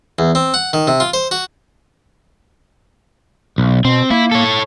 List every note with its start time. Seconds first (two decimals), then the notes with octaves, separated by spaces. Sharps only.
0.19 E2
0.35 C4
0.54 F#5
0.73 D#3
0.87 C3
1.00 F4
1.14 C5
1.31 F#4
3.58 B1
3.85 B2 C4
4.10 A#3 E4
4.32 A4 C#5